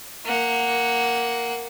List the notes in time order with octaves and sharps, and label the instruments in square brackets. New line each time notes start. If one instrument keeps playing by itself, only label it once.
[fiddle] A#3 F#5